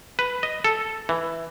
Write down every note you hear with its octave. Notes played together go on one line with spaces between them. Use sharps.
B4
D#5
A4
E3